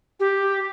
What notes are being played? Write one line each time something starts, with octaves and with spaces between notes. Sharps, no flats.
G4